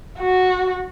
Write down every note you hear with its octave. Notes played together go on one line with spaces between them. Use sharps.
F#4